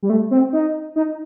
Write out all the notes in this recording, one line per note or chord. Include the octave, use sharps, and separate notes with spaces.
G3
A3
C4
D#4
D#4